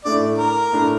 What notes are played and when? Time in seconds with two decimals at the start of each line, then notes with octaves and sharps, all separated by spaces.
0.05 A2 A3 D4 D5
0.38 A#4
0.72 A2 A3 D4